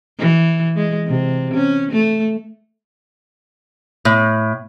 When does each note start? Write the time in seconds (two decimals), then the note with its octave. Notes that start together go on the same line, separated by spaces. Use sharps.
0.19 E3
0.76 G#3
1.07 C3
1.54 C#4
1.92 A3
4.05 A2